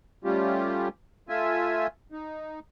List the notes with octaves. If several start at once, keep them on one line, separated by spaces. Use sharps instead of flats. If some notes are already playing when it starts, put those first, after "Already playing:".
G3 A3 C#4 F4 G4
A3 F4 E5 G#5
D#4